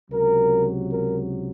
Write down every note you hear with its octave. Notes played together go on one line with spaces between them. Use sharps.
C#2 C3 F#3 A#4
A#4